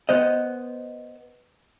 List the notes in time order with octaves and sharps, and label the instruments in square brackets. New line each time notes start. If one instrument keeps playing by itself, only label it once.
[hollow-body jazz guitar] B3 C5 D#5